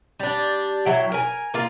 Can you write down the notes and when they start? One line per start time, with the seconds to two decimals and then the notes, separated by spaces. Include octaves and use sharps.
0.20 G3 D4
0.86 F#3 E4 G5
1.12 A#4 G#5
1.54 A#3 F4